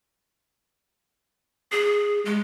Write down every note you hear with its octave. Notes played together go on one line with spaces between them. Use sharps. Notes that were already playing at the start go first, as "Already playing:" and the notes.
G#4
G#3